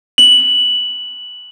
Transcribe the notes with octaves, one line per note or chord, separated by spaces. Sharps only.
F#7